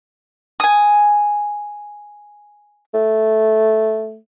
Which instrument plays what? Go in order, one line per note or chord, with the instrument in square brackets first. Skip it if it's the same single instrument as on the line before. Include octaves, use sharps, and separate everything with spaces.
[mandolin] G#5 D#6
[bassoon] A3